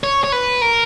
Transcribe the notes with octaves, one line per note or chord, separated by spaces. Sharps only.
C#5
C#5
B4
A#4